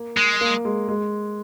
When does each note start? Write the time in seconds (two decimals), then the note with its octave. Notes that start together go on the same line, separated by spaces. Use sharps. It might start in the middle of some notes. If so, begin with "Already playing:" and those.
Already playing: A#3
0.17 G#3
0.41 A#3
0.65 G#3
0.88 G#3